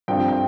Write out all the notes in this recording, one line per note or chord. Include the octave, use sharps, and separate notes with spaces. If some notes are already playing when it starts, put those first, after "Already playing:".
G2 F3 C4 G5
G5